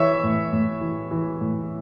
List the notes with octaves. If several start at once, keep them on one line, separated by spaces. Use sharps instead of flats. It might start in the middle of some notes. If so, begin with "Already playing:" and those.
Already playing: E3 C#5 E5
A2
A2
E3
E3
A2